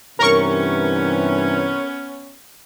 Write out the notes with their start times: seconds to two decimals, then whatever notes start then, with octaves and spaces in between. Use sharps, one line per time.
0.19 G2 C3 E3 B3 C#4 A#4 C#6